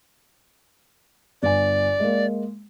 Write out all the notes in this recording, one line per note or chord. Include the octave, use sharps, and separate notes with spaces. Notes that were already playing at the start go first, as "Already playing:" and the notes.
G1 D5 G#5
G#3 A#3